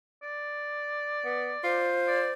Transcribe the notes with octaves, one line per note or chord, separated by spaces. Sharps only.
D5
B3
F4 C5
D5